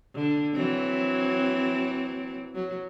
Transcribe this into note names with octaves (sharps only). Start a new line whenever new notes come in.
D3
E3 F#3 C4
F#3